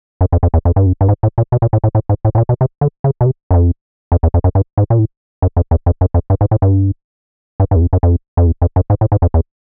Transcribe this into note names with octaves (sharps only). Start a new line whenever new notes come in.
F#2
F2
F2
E2
F2
G2
F#2
G2
G#2
A2
A#2
B2
A#2
A2
A2
A2
G#2
A2
A2
A#2
B2
C3
D3
C#3
B2
C3
F#2
F2
F2
E2
F2
F#2
G2
G#2
A#2
A2
F#2
F2
E2
F2
F#2
F2
G2
G#2
A2
G2
G2
G2
E2
F2
F#2
F2
F2
E2
F2
F#2
G#2
A2
G#2
F2
E2